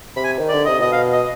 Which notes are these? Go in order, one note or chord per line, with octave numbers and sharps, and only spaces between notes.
C3 B5
G#5
D#3
D3 D5
C3 D#5
B2 D#5
F5
D#5